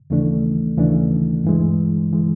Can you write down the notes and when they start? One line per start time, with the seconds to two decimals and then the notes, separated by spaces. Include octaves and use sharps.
0.10 D#2 C#3 E3 A3 D4
0.77 D#2 C#3 E3 A3 D4
1.44 G2 E3 G#3
2.13 E3 G#3